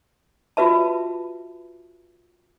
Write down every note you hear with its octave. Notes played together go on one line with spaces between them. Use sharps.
F4 F#4 B4 E5 A5